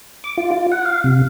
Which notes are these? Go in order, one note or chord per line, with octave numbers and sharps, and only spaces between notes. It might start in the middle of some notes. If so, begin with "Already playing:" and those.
D6
F4
F4
F#5
F5
C3